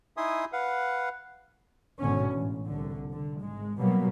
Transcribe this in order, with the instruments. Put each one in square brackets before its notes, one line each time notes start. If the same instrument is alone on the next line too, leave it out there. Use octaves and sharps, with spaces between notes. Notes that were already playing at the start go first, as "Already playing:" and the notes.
[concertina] D#4 E4 E5 G#5 C6 D#6
B4 F5 F#5
[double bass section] G#1 G#2 B2 D3 C#4
A1
C2 D3
D3
G#1 G#3
B2 F#3 G3 A#3 B3